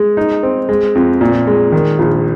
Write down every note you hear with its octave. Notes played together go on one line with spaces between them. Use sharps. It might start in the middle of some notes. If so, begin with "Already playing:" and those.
Already playing: G#3
D#4
C4
G#3
F2
A#2
G#3
D#3
A#1